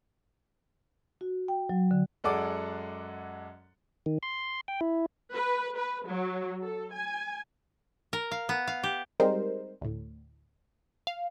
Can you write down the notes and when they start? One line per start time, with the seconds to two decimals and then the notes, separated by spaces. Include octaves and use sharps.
1.21 F#4
1.48 G5
1.69 F#3
1.91 D3
2.24 F#2 G#3 A4 D5 F#5 D6
4.06 D#3
4.23 C6
4.68 G5
4.81 E4
5.33 B4
5.77 B4
6.08 F#3
6.61 A4
6.93 G#5
8.13 A#4
8.31 F5
8.49 B3
8.67 F5
8.83 G4
9.20 G3 G#3 C4 D#4 A#4 C5
9.81 D2 A2
11.07 F5